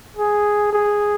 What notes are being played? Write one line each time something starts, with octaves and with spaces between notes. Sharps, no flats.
G#4
G#4